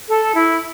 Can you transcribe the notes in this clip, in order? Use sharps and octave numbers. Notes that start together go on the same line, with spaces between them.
A4
E4